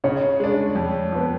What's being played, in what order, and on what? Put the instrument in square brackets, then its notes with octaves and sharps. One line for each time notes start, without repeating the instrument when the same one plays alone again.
[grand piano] C#3 [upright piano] C#5
[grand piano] G#3 D4
F2
F3 B3